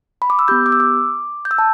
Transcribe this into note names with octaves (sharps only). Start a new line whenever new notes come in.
B5
D6
E6
B3 G4 G6
D6
E6
D6
G6
E6
A5